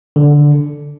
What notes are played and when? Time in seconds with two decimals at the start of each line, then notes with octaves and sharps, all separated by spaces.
0.16 D3